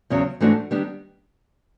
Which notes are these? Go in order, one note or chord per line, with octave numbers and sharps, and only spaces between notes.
E2 C#3 F#3
G#2 E3 A3 D4 F#4
D#3 G3 B3 D4 G4